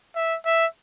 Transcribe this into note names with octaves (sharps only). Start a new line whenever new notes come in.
E5
E5